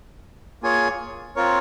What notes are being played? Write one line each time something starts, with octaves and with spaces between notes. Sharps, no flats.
A#3 F4 G#4 C#5 G#5
C4 F4 A#4 C#5